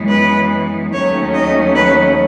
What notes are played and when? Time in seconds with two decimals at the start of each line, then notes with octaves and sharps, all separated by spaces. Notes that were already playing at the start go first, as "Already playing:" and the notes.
Already playing: F#2 E3 G#3 B3
0.10 B4
0.93 D#2 D#3 F#3 A3 C#4 C#5
1.34 D#5
1.76 B4